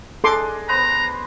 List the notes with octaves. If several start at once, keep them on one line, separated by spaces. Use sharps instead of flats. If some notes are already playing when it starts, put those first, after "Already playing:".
D4 G#4 A4 D#5 C6 D6
B3 B4 C5 A#5